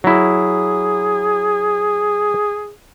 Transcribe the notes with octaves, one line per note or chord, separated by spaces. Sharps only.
F#3 E4 G#4